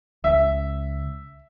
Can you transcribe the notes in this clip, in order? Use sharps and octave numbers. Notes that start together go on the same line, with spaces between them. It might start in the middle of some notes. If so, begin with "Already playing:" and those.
C#2 E5